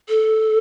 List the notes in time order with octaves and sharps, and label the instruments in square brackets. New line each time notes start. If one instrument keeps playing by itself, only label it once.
[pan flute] A4